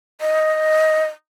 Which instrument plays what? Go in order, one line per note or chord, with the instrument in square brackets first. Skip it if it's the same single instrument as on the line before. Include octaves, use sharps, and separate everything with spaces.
[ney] D#5